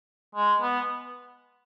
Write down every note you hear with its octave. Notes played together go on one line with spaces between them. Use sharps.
G#3
B3